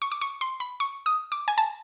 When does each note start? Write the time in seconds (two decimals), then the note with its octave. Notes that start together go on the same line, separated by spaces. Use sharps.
0.02 C#6
0.12 D6
0.21 C#6
0.41 C6
0.60 B5
0.80 C#6
1.06 D#6
1.32 D6
1.48 G#5
1.58 A5